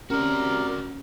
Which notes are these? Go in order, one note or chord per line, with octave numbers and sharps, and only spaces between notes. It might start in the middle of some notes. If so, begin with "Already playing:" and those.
C3 C#4 F#4 A#4 D5